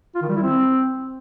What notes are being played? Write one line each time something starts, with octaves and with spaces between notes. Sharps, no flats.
F4
D#3
G3
E4
C4